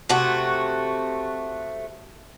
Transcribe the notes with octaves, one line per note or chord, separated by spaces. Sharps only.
C3 A3 F#4